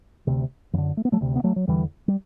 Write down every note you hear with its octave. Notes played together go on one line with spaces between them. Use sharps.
D2 C3
F#2 D3 E3
A3
B3
F#3 A3
D2 C3
B3
F#3 A3
F#3
E2 D3 E3 G3
G3